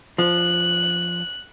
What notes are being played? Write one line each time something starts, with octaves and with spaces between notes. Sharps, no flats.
F3 F#6